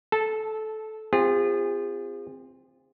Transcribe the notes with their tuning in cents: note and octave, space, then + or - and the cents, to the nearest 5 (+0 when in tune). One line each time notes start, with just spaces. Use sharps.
A4 -15 A5 +0
C4 +0 F4 +0 G#4 -35